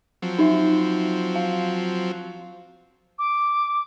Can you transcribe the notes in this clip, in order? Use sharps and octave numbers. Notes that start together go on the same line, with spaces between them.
F3 F#3 C4
D#4 E5
F5
D6